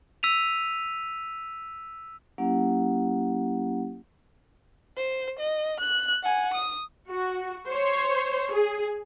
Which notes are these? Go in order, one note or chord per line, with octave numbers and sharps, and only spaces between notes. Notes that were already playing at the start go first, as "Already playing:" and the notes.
E6 B6 D#7 F7
F#3 A#3 C#4 E4 G4 F#5
C5
D#5
F#6
F#5 G#5
D#6
F#4
C5 C#5
G#4